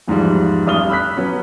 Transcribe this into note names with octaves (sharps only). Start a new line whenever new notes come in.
E2 G#2 F3 G3
A1 G2 D4 D#6 F6 G7
B5 E6 F#6 B6
F#3 B3 C#4